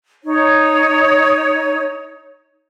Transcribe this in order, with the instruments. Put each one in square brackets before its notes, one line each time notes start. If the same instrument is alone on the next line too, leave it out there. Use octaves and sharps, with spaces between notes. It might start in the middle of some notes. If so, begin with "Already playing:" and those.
[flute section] D#4 C#5